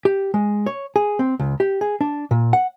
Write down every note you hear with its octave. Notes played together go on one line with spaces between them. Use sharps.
G4
G#3
C#5
G#4
C4
C#2
G4
G#4
D4
A#2
F#5